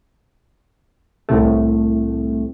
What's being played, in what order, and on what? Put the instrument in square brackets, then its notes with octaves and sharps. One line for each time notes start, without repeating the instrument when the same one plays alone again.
[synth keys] C2 A2 C3 A3